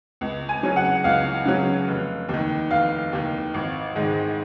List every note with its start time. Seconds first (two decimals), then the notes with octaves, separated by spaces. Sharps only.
0.21 C#2
0.49 G#5
0.63 C#3 F#3 C#4
0.76 F#5
1.04 C#2 F5
1.46 C#3 F#3 C#4
1.87 F1
2.29 D#2 D#3
2.71 F1 F5
3.13 D#2 D#3
3.54 G#1
3.96 G#2 D#3 G#3